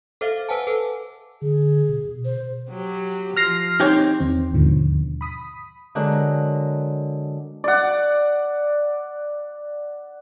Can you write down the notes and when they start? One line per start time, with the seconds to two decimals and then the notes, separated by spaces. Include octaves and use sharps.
0.21 A4 C5 E5 F5
0.49 B4 C5 F#5 G#5 A5
0.67 A4 B4
1.42 D3 G#4
1.89 B2
2.05 B2
2.25 C5
2.71 F#3 G4
3.37 F3 F6 A#6 C7
3.80 C4 D#4 G4 C#5
4.20 E2 D#3 C4
4.53 D#2 G#2 B2 D3 D#3 F3
5.21 B5 D#6 B6
5.95 D3 F#3 G#3 A#4 F#6
7.64 D5 F#5